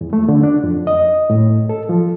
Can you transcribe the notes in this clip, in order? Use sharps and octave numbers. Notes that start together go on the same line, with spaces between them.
E2
A3
D3
D4
F2
D#5
A2
A4
F3